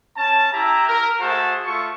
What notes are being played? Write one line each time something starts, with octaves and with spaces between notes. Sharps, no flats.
C#4 A5
E4 G4 E5 A#5
A#4
A3 F#4 G#4 C5 A5
A3 F4 A4 C#6